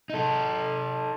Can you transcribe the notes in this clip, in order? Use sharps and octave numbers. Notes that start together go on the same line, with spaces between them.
D#4 A4